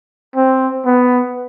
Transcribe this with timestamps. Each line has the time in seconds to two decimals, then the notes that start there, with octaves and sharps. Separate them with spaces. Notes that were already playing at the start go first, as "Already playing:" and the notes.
0.36 C4
0.86 B3